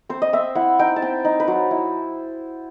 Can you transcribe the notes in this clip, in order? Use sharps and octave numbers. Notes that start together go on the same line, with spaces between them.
C4 C5
D#5
C4 E5
E4 F#5
D#4 G5
A5
C4 G5
D#4
B4
F#3 C5
E4